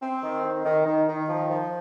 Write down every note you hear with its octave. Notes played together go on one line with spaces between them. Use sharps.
C4
D#3
D#3
D#3
D#3
D#3
F3
F3